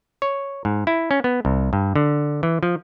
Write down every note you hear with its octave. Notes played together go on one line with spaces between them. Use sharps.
C#5
G#2
E4
C#4
B3
C2
G2
D3
E3
F3